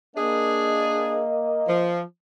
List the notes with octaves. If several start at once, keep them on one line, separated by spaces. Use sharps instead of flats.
A#3 D4 G#4 D#5
F3